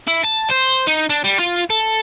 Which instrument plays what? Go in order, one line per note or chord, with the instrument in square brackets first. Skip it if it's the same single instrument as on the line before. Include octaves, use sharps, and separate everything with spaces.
[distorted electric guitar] E4
A5
C5
D#4
D4
G3
F4
A4